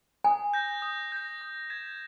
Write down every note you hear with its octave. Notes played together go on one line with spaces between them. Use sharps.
G#5 D#6
G6 A#6
D#6
G6 A#6
D#6
G#6 B6 E7